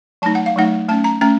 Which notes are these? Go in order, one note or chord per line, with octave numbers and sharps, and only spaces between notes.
F#3 A3 D#4 A5
F#5
F5
F#3 A3 D#4 F#5
A3 C#4 A5
A#5
A3 C#4 A#5